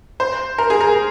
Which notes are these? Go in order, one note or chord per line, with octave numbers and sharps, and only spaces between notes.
C5
A#4
G#4
A#4